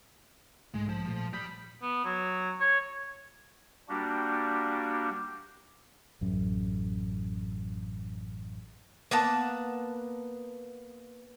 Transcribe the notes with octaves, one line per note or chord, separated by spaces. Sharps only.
B1 G#2 G#3 A3
F3
A#2 A3
G3 B5 D#6 G6 B6
B3
F#3
C#5
G3 A#3 D4 F#4 G4
A1 F#2
A#3 B3 F#5 A5